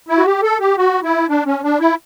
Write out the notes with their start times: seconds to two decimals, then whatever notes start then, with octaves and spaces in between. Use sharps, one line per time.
0.08 E4
0.18 F#4
0.26 G4
0.43 A4
0.60 G4
0.77 F#4
1.03 E4
1.28 D4
1.46 C#4
1.63 D4
1.79 E4